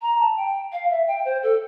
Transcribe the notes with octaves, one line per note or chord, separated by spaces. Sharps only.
A#5
A5
G5
F5
E5
G5
C5
A4